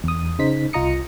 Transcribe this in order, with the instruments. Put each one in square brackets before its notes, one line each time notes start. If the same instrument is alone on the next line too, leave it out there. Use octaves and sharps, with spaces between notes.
[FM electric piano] E2 D#6
C#3 D#4 C5 B6
C2 F4 D#5 A#5 D#6 C#7